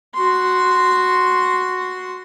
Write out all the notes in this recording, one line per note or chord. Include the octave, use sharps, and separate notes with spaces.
F#4 C6